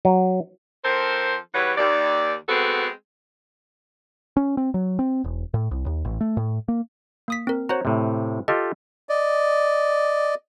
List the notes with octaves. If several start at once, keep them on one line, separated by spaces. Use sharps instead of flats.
F#3
F3 C4 A4 A#4 C5
E2 E3 G3 B4 C#5 F#5
D#2 D5
G#3 B3 C4 F#4 A4 B4
C#4
C4
F#3
C4
E1
A2
C2
D#2
A1
A3
A2
A#3
A#3 D#6 B6
C4 A#4
F#4 C5 C#5 A#5
A2 C3
F4 G4 A4 D#5
D5 D#5